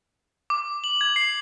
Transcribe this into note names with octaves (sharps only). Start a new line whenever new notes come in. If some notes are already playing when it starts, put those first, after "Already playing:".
D6
F#7
G#6
C7